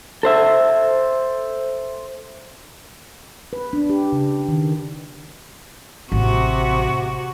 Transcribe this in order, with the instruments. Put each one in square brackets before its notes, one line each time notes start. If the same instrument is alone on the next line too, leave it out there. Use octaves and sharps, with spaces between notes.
[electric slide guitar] A4 C5 E5
[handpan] B4
D4
G4
C#3
D#3
[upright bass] A1 [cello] C3 F#4